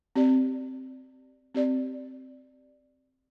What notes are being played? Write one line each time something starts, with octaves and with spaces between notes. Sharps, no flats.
C4 G4 D5
C4 G4 D5